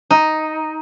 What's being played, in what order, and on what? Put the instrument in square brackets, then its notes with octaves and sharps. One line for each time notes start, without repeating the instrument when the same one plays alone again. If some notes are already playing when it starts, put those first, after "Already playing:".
[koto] D#4